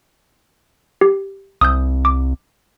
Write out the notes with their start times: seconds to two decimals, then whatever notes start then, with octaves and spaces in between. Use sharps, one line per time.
1.01 G4
1.61 C2 D#6 E6 G6
2.05 D6